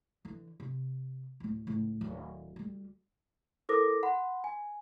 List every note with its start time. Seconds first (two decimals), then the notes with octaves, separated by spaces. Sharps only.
0.25 D3 E3
0.60 C3
1.40 D2 A2
1.67 C#2 A2
2.01 D1 D#3
2.56 D2 G3
3.69 E4 A4 A#4 C5 D6 A#6
4.03 F#5 B5 C6
4.44 G#5